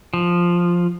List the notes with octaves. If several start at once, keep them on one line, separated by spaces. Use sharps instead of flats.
F3